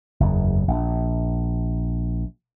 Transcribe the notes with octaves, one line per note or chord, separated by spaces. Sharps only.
F#1 E2
A#1